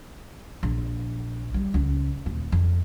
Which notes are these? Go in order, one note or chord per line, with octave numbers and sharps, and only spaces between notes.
A#1
G3
C#2
D#1
F2